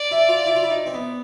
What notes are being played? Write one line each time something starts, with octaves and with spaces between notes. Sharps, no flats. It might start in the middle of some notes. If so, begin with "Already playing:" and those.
Already playing: D5
E4
F4
E4
F4
E4
D#4
C4
B3